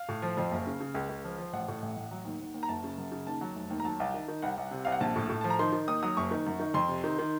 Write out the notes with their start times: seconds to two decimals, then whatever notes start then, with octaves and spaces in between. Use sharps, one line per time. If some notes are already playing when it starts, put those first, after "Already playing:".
Already playing: F5
0.09 A2
0.22 F3
0.37 F2
0.52 F#1
0.67 C#3
0.80 C#3
0.95 C#2
1.09 C#2
1.24 F3
1.38 F3
1.53 A1 F#5
1.68 A2
1.82 A1
1.97 A1
2.11 F#3
2.25 D#2
2.41 D#2
2.54 D#2
2.63 A#5
2.68 F#1 A5
2.84 C#3
2.98 F#2
3.12 C#3
3.27 D#2 A5
3.41 F#3
3.55 F1
3.70 D#2
3.80 A#5
3.85 F#3 A5
4.00 C2
4.14 D#3
4.28 D#3
4.42 C2 F#5
4.57 C2
4.71 C3
4.85 C2 F5
4.92 F#5
5.00 A#1 A5
5.16 A2
5.29 A2
5.41 F3 A5
5.50 A#5
5.59 D#3 C6
5.73 D#3
5.87 D#2 D#6
6.03 F#3 D#6
6.17 F#1 C#6
6.31 D#3
6.46 F#2
6.59 D#3
6.74 F2 C6
6.88 C3
7.04 D#3
7.19 D#3